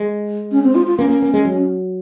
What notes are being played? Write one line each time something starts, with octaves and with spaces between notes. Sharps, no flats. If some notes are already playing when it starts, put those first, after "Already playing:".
Already playing: G#3
C#4
C4
F4
F4
A#3 C#4
A#3
A#3
G#3
F#3